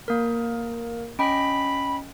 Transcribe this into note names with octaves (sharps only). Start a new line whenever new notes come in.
A#3 A#4
C#4 D#5 G5 B5